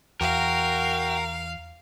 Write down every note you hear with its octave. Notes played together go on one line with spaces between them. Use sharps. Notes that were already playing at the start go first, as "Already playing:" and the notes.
E2 F#4 A#4 F5 G5